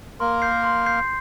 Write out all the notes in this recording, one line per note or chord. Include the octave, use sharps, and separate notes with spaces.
A#3 A#4 C6
G6 C7
C6
G6 C7